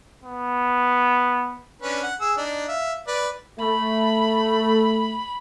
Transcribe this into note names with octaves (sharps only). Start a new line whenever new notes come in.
B3
C#4 D4 B4
F#5
G#4 E6
D4 D#4
E5 F5
B4 D5
A3 B5